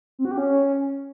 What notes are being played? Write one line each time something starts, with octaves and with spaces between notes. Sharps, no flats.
C4
F#4
G4
C#4